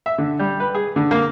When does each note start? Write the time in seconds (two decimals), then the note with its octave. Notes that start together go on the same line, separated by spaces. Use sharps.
0.06 E5
0.18 D3
0.39 G3
0.60 B4
0.74 G#4
0.96 D3
1.11 A#3